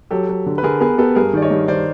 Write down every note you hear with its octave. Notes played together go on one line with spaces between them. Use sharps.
F#3 G4 A4
F#3
D3
B4
D3 G#4 A#4
B3 G#4 A#4
B3 G4 A4
G2 G#4 A#4
D#3 D5
C#5 D#5
G2
D#3 C5 D5